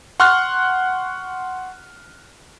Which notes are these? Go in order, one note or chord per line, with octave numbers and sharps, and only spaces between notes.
F#5 C6 C#6 F6 F#6